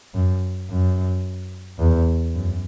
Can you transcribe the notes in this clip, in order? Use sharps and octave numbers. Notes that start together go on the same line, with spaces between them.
F#2
F#2
E2
F#2